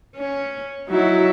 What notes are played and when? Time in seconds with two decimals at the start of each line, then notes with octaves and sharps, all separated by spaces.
0.16 C#4
0.89 F#3 D#4 E4 F#4